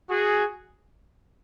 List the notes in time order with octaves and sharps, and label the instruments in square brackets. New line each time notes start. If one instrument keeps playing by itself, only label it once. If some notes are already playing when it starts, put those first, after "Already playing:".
[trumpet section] F#4 G#4